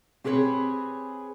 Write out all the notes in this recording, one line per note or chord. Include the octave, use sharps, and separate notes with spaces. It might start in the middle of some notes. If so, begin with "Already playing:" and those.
C4 G4 G#4 B4 C#5